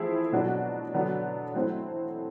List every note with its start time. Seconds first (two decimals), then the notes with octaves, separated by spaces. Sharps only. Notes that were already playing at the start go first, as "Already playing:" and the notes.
Already playing: F3 A3 C4 E4 G#4
0.32 B2 F#3 B3 D4 F#4
0.94 D3 F#3 B3 D4 F#4
1.55 F#3 A3 C4 E4